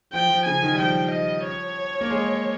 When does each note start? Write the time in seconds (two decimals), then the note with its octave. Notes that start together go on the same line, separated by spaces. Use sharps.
0.13 F3 G5
0.30 F3
0.46 C#3 G#5
0.62 D#3
0.74 G3
0.79 F3 G5
1.11 D#5
1.45 C#5
2.01 A#3
2.11 G#3